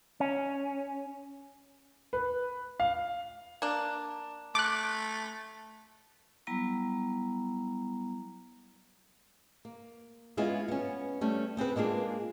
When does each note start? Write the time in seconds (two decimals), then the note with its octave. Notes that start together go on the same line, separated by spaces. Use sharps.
0.20 C#4
2.13 B4
2.80 F5
3.62 A#3 D4
4.55 A3 D6 F#6
6.47 F#3 G3 B3 E4 A#5
9.65 A#3
10.37 G#3 B3 C#4 E4 F4 G#4
10.68 B3 C#4
11.21 G3 A3 C#4
11.57 B3 C4 G#4 B4
11.76 G#3 A#3 D4 F4 G#4